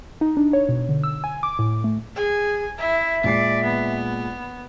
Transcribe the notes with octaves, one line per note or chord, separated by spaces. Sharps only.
D#4
D4
C#5
B2
D3
E6
G#5
D6
A2
A3
G#4 G#5
E4 E5
A#2 G#3 D5 C7
B3